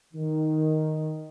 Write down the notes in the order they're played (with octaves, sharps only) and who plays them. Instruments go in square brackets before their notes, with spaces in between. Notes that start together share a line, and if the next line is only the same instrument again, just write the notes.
[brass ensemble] D#3